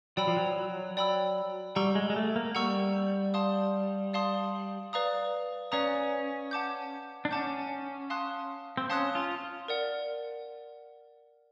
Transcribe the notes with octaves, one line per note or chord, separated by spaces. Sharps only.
F#3 D5 G5 B5 E6
F3
F#3
F#3
D5 G5 B5 E6
G3 F#5 A#5 C#6 E6
G#3
G#3
A3
A#3
G3 F#5 A#5 C#6 E6
D5 F5 A5 C6 D#6
D5 F5 A5 C6 D#6
B4 D5 F5 A#5 D#6
C#4 B4 D5 F5 A#5 D#6
F#5 A5 D6 G6
D4
C#4 F#5 A5 D6 G6
F5 A5 C6 D#6 F#6
C4
C#4 F5 A5 C6 D#6 F#6
F4
A#4 D5 F#5